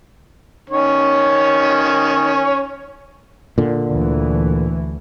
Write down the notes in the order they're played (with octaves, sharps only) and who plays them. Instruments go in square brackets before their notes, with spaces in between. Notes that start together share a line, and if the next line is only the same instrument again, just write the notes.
[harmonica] D#3 C#4 C#5
[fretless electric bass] A#2 D3
[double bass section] D2 E3